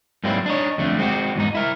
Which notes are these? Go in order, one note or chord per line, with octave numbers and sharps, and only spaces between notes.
G#2 F#3 G3 A#3 C4 E4
D4 D#4 C#5
F2 D3 A3
G#3 C4 C#4 F#4 G4
E2 G#2 D#4
E4 A#4